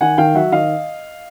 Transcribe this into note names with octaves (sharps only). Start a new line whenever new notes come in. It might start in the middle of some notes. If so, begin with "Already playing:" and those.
D#3 F#5 G#5
D#3 F5 G5
F#3 E5 F#5
D#3 D#5 F5